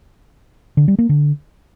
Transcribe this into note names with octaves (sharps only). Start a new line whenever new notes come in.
D3
G3
A#3
D3